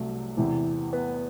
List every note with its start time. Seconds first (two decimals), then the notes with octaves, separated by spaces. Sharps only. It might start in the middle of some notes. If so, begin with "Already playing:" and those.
Already playing: C2 C3 F#3 A3
0.37 E2 C3 E3
0.93 B3